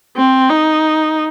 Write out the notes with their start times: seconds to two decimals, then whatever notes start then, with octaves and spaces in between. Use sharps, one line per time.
0.17 C4
0.50 D#4